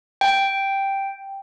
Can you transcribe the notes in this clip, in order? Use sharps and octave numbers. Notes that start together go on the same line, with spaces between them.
G5